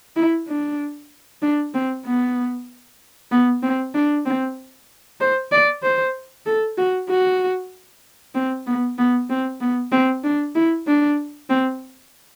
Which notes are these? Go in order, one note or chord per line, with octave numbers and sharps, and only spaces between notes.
E4
D4
D4
C4
B3
B3
C4
D4
C4
C5
D5
C5
A4
F#4
F#4
C4
B3
B3
C4
B3
C4
D4
E4
D4
C4